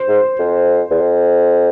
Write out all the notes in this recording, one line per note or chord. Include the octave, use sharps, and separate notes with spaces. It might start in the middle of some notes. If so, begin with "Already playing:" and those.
Already playing: C5
G#2
F2
E2
F2